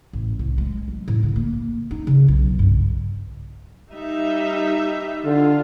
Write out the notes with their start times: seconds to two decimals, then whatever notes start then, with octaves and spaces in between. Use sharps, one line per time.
0.13 A1
0.39 C2
0.58 G#3
0.88 F#3
1.08 A2
1.23 D3
1.36 A#3
1.91 D#4
2.07 C#3
2.28 B1
2.59 G2
3.92 G3 D#4 E5
5.25 D3 F4